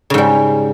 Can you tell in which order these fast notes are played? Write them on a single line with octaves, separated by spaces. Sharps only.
C#3 G#2 G3